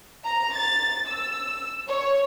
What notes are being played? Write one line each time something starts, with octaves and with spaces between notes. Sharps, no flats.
A#5
A6
E6
C#5